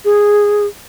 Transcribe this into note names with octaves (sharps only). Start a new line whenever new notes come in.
G#4